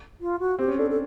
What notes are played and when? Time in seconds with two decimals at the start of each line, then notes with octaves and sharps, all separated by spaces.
0.21 F4
0.39 F#4
0.59 C4 G4
0.68 C#4
0.78 D4 A4
0.90 A4